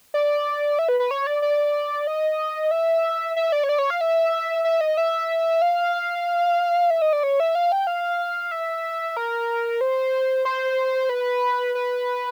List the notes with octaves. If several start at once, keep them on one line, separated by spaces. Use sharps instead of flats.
D5
E5
B4
B4
C#5
D5
D5
D#5
E5
E5
D5
C#5
D5
C#5
F5
E5
E5
D#5
E5
F5
E5
D#5
D5
C#5
E5
F5
G5
F5
E5
A#4
C5
C5
B4
B4